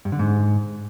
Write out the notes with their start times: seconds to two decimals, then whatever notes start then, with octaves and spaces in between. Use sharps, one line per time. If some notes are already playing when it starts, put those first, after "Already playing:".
0.05 G2
0.12 D3
0.19 G#2